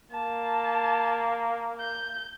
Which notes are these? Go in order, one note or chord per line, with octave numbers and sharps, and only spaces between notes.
A#3 A5
G6